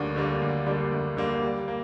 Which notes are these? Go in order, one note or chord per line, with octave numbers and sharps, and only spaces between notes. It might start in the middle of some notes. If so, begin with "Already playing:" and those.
Already playing: D2 D3 G3 A#3 D4
D3 G3 A#3 D4
D2
D3 G3 A#3 D4
D2
D3 G3 A#3 D4
G3
A#3